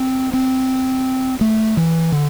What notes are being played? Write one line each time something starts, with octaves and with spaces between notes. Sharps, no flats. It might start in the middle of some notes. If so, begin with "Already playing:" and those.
Already playing: C4
C4
A3
E3
D3